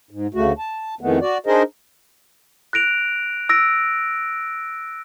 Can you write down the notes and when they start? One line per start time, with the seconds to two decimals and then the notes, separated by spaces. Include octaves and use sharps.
0.11 G#2
0.34 D2 C#3 A3 F#4
0.58 A5
1.01 F2 D#3 E3 G#3 A3 B3
1.21 F#4 D5
1.46 D4 D#4 G#4 A#4 C5 D#5
2.73 F#6 A#6 D7 F7
3.49 E6 A#6 D7